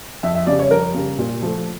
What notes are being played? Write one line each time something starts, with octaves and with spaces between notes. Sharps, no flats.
F2 E5
E5
C#3 G3 D5
C#5
F2 A#4
C#3 G3
A#2
F3 A3